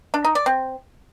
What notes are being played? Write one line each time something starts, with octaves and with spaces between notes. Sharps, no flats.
D4
D#4
D5
C4